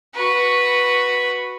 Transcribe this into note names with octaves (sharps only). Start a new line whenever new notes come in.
F#4 B4